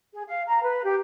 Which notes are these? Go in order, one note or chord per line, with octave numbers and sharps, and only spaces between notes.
G#4
F5
A#5
B4
G4